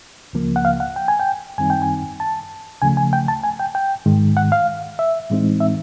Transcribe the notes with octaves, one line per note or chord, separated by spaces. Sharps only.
C#2 C#3 F3 A#3
F#5
F5
F#5
G5
G#5
G5
F#2 D#3 G3 C4 D#4 G#5
G5
G#5
A5
D2 C#3 F3 A3 G#5
G#5
G5
A5
G#5
G5
G5
G#2 D#3 G#3
F#5
F5
E5
A2 E3 G#3 C4 D#4
E5